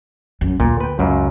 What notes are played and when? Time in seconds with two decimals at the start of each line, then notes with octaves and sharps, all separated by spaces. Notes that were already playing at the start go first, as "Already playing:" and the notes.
0.41 F#2
0.60 D2 A#2
0.80 B4 G5
0.99 C#2 F#2